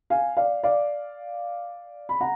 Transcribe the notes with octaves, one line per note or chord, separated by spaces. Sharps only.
F5 G#5
D5 F5
D5 F5
B5
F#5 A#5